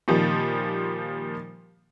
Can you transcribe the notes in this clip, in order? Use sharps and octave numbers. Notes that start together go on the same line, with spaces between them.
A#2 D#3 F3 G3